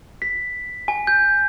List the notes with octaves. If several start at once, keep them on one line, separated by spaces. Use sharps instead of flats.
B6
G#5
G6